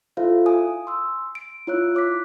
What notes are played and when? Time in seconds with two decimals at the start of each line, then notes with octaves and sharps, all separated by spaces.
0.17 E4 F4 A4 C5 E5 F5
0.46 G#5 D#6
0.87 C6 E6
1.35 D7
1.67 E4 F4 C#5 E6 F#6
1.95 C#5 D6 F#6 B6